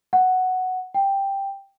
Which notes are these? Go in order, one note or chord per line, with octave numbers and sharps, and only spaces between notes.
F#5
G5